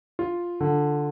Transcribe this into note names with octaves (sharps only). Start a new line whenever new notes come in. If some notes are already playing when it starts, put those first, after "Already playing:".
F4
D3